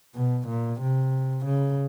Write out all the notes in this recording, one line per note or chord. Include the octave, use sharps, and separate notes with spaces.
B2
A#2
C3
C#3